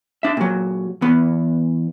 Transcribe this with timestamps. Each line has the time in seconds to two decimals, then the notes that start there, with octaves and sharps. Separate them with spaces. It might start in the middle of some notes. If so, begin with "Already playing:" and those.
0.23 D4 E5
0.37 A#2 F#3
1.02 E2 B3